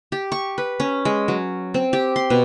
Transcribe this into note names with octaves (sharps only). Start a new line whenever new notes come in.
G4
C#6
B4
C#4
G#3
F#3
C4
G4
C6
B2